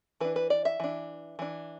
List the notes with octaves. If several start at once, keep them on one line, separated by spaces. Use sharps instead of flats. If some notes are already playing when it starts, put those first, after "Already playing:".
E3 D4 B4
B4
D5
E5
E3 D4
E3 D4